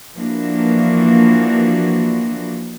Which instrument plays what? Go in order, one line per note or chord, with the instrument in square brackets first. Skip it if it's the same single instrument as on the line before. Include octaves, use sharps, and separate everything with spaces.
[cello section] E3 F3 A#3 D4 F#4